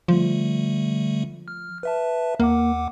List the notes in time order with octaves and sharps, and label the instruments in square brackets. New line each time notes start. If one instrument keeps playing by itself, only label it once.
[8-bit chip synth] D3 G3 A3 [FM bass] F3
[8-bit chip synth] F6
B4 E5 A5
[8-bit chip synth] D#2 F#5 D6 [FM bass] A#3